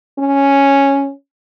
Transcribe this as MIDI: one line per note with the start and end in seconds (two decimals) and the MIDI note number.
0.19 1.10 61